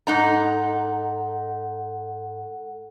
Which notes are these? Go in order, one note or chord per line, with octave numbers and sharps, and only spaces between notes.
G#2 D#4 A4 F#5 A#5